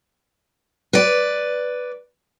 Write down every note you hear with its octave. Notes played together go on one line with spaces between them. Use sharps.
B4 D5